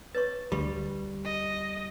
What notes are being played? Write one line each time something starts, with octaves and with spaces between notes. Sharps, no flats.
B4 C#5 C#6 A6
D2 G3 C#6
D#5